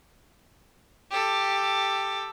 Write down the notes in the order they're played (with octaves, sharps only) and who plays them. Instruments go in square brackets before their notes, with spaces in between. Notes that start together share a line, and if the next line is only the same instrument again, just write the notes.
[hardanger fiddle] G4 A4